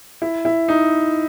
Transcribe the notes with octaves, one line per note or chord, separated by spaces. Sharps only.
E4
E4
D#4